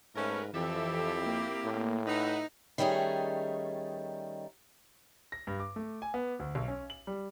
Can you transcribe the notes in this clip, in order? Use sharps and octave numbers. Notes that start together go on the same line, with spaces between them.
G#2 A3 C#4 A#4 B4
F2 E3 C4 E4 G4 A4 E5
A#3
A2
D#4 B4 E5 F#5
D#3 G3 A3 C#4 D#4 G#4
A#6
G2
D6
A3
G#5
B3
D2
B1
C#4
F#7
G3